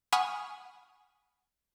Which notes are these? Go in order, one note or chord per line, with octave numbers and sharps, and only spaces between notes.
F#5 G#5 B5 C#6 D#6 F6